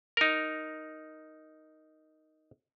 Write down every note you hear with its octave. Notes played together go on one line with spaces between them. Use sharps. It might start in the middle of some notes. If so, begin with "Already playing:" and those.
D#4 A#4